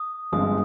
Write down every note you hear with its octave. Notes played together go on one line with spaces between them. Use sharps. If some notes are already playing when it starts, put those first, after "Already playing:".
Already playing: D#6
G1 G2 F3 G#3 C4 D#6